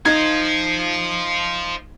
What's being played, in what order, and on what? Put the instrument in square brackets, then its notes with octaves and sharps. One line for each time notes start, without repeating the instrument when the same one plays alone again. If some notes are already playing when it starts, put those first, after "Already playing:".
[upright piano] D#4 G#6 [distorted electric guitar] C5 F5